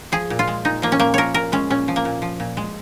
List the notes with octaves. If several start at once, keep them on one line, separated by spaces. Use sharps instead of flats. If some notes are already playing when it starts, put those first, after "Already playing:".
F3 G#4
A#2
F4
G#3
A#2 D#4
F3 A#3
C#4
A#2 A#3
F3 A#4 C#5
A#2 A#4
G#3 C#4
A#2 C#4
F3
A#3
A#2
F3
A#2
G#3